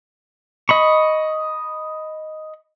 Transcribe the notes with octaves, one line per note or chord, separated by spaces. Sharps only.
D#5 B5 C#6